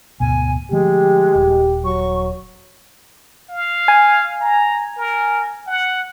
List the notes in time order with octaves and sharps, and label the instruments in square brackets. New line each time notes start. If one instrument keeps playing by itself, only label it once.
[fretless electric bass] D2 G#2 B2 [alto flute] G#5
[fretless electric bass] D3 F3 A3 [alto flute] G#3 [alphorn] G4
[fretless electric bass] D#1
[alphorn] F#3 [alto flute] C#6
[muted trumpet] F5
[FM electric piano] G#5
[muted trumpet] A#5
A#4
F#5